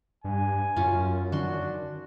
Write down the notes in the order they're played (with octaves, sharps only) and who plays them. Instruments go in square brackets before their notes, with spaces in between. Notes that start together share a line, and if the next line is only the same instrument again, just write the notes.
[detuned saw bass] G2 [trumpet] G#5
[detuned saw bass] F#2 [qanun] C#4 F4
[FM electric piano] D3 D#3 [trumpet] D4 [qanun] F#4 C6